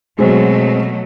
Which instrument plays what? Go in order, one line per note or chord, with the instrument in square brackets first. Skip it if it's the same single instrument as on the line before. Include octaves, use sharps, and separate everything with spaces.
[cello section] B2 F#3 A3 [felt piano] G#3 C4